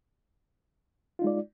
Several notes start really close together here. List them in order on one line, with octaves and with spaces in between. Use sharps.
F4 D#4 G#3 D5